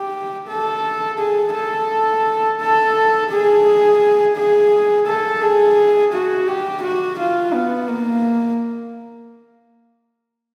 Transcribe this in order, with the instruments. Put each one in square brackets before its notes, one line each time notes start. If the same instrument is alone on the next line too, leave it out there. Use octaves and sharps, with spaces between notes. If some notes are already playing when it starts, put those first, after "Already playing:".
Already playing: [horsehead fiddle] G4
A4
G#4
A4
A4
G#4
G#4
A4
G#4
F#4
G4
F#4
F4
B3
A#3